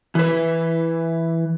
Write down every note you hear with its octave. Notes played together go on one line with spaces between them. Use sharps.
E3 B4